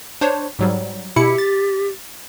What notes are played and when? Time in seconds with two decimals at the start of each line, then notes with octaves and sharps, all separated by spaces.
0.21 D4 C5 C#5
0.59 G#2 F#3 G3
1.16 B2 E4 G4 C#7
1.38 A6